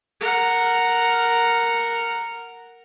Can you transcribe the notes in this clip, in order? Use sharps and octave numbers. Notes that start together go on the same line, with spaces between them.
A#4 F#5